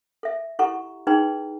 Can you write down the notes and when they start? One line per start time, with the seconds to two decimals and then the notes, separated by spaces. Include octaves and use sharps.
0.23 A4 E5
0.59 E4 G4 A4 F#5 A#5 C#6
1.07 D#4 G#4 B4 G5 A#5 C6